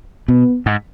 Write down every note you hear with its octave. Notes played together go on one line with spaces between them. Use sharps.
B2 B3
G#2